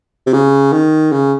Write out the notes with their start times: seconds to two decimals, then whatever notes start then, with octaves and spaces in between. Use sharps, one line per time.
0.27 C3
0.33 C#3
0.72 D#3
1.12 C#3